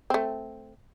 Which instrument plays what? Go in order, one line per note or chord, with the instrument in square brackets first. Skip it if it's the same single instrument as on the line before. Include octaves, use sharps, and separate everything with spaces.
[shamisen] A3 C4